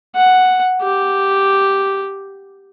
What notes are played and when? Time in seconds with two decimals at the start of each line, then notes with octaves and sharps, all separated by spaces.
0.16 F#5
0.82 G4